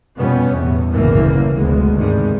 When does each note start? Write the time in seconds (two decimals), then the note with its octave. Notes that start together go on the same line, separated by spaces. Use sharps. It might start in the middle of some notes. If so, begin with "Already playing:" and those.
0.17 F2 B2 G3 B3 C#4
0.52 E2 A2
0.92 F#1 D2 G2 B2 E3 A#3
1.57 D2 G#3 B3
1.95 G2 C3 D#3 G3 G#3